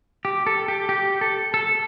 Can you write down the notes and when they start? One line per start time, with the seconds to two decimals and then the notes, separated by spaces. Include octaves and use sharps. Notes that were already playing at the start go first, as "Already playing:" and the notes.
0.25 G4
0.47 A4
0.68 G4
0.89 G4
1.21 A4
1.54 A4